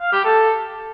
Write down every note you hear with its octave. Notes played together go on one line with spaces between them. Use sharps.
F5
G4
A4